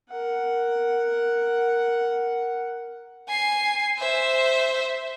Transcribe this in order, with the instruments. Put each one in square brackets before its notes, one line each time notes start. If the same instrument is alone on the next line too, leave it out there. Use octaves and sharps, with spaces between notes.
[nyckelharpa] A#4 F#5
[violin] G#5 C7
C5 E5